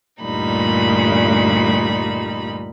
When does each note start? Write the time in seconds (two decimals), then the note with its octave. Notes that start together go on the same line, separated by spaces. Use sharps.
0.23 D2 G2 A#2 G3 D#4 B5